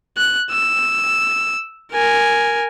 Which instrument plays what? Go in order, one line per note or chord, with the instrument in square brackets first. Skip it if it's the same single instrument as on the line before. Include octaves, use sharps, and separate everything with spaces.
[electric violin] F#6
E6
A#4 G#5